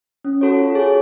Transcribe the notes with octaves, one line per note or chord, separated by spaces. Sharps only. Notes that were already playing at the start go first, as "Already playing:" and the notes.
C#4
F#4 A4 C#5
F4
G#4 C#5